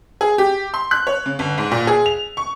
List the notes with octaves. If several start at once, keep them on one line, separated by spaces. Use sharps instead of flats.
G#4
G4
C6
F#6
C#5
C#3
G1
G#2
A#2
G#4
F7
C#6